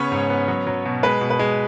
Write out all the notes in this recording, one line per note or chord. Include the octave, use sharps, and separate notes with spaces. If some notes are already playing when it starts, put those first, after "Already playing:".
Already playing: C#3 B3 C#4 C#5
G#2
B3
F#3
F#3
B2
G#3 B4
B2
B4
G#3